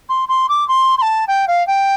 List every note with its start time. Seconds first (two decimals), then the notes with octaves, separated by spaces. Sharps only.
0.09 C6
0.28 C6
0.49 D6
0.68 C6
0.98 C6
1.01 A5
1.27 G5
1.47 F5
1.67 G5